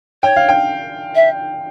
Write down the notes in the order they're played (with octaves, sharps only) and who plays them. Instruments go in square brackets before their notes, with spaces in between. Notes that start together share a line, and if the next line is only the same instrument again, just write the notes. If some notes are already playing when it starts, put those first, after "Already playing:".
[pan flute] C#5 [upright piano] G5
[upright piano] F5
G5
[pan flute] E5